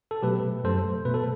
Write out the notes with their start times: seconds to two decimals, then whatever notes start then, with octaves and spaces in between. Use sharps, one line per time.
0.11 A4
0.22 B2 F#3 A3 G4 B4
0.64 F#2 F#3 A3 A4 C5
1.05 B2 A3 B4
1.14 A4